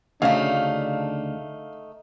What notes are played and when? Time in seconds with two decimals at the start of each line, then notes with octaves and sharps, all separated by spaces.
0.22 D2 C#3 A3 D4 D#4 F5